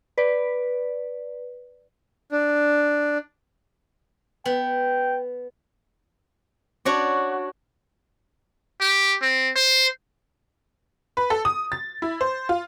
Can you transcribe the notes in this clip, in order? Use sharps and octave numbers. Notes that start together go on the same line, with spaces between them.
B4 D5
D4
B3 G5
D4 F#4 C#5 D5
G4
C4
C5
B4
A4
D#6
A6
E4
C5
F4